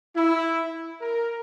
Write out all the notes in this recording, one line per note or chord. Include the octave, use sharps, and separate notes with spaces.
E4
A#4